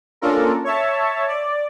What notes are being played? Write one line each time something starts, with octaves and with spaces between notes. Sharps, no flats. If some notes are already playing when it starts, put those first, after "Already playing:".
A#3 C#4 D4 F4 A4 A#4
C#5 E5 A5
D5